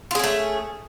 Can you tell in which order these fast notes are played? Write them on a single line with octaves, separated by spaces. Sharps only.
F4 G#4 C#4 A3